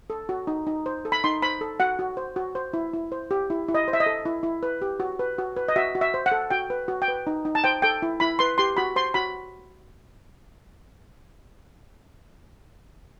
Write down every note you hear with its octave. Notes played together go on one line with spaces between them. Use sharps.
A4
F#4
D#4
D#4
C5
A4
B5
D#4 C6
C5 B5
A4
F#4 F#5
F#4
C5
F#4
C5
E4
E4
C5
G4
E4
E4
D#5
C5
E5
D#5
A4
E4
E4
B4
G4
F#4
B4
F#4
B4
D#5
F#4 E5
F#4
E5
C5
F#5
A4
F#4 G5
B4
F#4
G5
B4
D#4
D#4
A5
C5 G5
A4 G5
E4
E4 B5
B4 C6
G4 C6
F#4 B5
C5 C6
F#4 B5